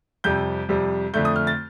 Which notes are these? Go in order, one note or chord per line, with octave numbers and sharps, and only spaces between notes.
F2 C3 G3 G6
F2 C3 G3
F2 D3 A3 G6
D#6
F6
A6